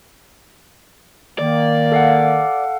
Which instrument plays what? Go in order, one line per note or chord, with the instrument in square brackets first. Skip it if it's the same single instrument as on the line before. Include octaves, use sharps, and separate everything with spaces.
[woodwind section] D#3 A#3 [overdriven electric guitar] D5
[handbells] A4 F5 F#5